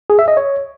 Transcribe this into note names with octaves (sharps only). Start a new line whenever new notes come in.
G#4
E5
D#5
C#5